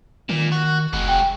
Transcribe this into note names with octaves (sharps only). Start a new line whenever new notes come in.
A#2 D#3
F#4
F1 G#3 F#4
G5